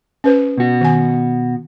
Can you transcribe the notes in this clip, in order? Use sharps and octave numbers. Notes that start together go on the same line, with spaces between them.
C#4 B4 C5
B2 F#4
D#3 G#5